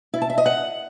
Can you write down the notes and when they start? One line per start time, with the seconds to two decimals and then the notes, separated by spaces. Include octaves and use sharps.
0.14 E4
0.22 A5
0.30 E5
0.38 D#5
0.46 F#5